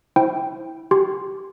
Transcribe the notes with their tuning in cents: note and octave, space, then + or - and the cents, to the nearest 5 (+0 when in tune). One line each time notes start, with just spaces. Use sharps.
E4 -15 C5 +0 G5 +0
G4 -15 G#5 +0 C6 +0